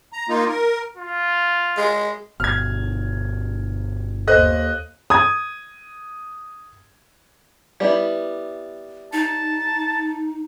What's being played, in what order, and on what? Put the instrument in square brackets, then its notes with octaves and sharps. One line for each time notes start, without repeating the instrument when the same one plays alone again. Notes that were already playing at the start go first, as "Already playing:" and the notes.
[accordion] A#5
A#3 D#4 F4
A#4
[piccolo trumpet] F4
[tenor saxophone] G#3
[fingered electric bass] G1 B2 [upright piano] F6 G#6
[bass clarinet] D#2 [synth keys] A4 C5 [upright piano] D#5 F#6
[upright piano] D#6 G#6
[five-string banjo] G3 B3 E4
[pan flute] D#4 [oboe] A5